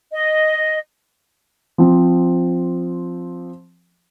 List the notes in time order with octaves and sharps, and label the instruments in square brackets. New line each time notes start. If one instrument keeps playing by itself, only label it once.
[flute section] D#5
[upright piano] F3 C4